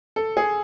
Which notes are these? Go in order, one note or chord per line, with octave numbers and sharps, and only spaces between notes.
A4
G#4